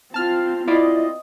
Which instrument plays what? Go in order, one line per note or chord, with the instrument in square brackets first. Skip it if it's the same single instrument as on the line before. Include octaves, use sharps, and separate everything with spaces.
[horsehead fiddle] C4 F4 [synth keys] A5 F6
[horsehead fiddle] C4 D#5 [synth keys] E4 F4 D5